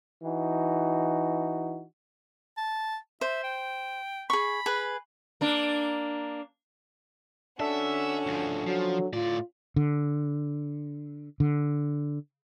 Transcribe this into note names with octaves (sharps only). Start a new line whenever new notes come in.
E3 D#4 F#4
A5
C5 E5
G5
G#4 B5 C#6
G#4 B4
A#3 D4
C#4 D4 F#4 A4 E5
D2 F3
F3 F#3
A2 F4 D5
D3
D3